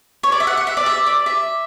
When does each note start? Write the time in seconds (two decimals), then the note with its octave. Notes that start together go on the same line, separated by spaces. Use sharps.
0.23 C#5
0.32 D5
0.40 E5
0.47 F#5
0.57 F#5
0.67 E5
0.77 D5
0.86 E5
1.06 D5
1.26 E5